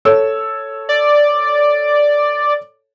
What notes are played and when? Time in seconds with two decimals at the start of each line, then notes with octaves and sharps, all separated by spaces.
0.05 A4 C#5 E6
0.89 D5